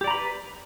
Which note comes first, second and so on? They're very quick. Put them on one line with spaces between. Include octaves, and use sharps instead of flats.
G4 D5 A#5 B5 B4